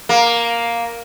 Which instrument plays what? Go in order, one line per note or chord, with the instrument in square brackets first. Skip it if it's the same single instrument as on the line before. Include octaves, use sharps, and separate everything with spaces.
[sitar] A#3